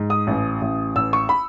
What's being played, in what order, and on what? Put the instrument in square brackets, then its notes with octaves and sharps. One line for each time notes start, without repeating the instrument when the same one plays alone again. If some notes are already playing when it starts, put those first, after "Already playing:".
Already playing: [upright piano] G#2
D#6
A1
A1
A1 E6
C#6
B5